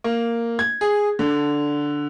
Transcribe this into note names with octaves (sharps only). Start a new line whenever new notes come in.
A#3
G#6
G#4
D3